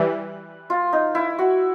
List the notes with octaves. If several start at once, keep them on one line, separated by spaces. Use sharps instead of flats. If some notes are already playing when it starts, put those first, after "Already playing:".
Already playing: E3 G3 B4
F4
D#4
E4
F#4